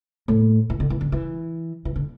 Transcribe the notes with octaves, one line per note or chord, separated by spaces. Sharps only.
A2
E3
D3
E3
D3
E3
E3
D3